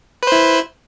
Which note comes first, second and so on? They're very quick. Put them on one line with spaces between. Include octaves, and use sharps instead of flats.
B4 C5 E4